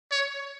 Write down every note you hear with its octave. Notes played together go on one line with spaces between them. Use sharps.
C#5